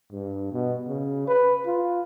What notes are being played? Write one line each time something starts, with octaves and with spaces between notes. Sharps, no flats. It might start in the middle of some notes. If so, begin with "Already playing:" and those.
G2
B2
C#3
B4
F4